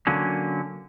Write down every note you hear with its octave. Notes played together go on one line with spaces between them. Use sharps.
D3 F#3 A#3 C#4